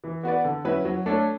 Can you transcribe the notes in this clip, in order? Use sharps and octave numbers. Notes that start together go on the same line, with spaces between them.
E3
B3 F#4 B4 D5
D3
F#3 C#4 E4 B4
F#3
A3 D4 A4 C#5